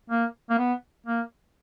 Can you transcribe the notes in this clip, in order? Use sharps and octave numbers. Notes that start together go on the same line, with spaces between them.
A#3
A#3
B3
A#3